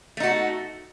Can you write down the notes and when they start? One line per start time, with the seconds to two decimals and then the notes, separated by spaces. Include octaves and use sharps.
0.17 A3
0.20 D#4
0.23 F#4